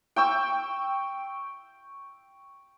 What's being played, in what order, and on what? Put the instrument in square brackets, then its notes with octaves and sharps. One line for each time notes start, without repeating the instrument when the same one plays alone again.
[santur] G5 C#6 E6